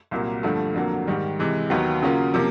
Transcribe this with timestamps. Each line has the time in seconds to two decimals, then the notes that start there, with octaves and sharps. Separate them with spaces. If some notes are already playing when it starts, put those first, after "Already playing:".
0.11 C2 A#2 F#3 A#3
0.43 G2 D3 F3 A3
0.75 F2 D3 F#3 A#3
1.07 G#2 D#3 G3
1.39 C3 E3 G#3
1.70 D#2 D#3 F#3 B3
2.02 C#3 F#3 A#3 C#4 F4
2.34 C3 F3 A#3 C#4